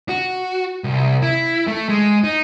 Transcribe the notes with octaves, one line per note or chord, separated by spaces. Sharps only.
F#4
C2
E4
A3
G#3
D#4